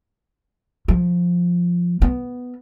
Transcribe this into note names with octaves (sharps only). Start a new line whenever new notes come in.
F3
B3